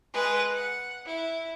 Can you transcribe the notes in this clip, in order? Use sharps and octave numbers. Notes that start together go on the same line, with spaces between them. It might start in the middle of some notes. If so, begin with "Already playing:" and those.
G#3 B4
F#5
E4